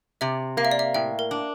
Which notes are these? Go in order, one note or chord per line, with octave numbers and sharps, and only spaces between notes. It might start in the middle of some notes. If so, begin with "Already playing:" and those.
C3 E5
A#3 F5
E5
D5
E5
A2 E5 G5
A#4
D4